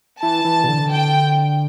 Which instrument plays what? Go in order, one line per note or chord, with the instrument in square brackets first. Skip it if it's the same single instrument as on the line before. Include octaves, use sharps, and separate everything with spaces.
[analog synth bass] E3 [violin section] A5
[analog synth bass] E3
B2
D3
[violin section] G5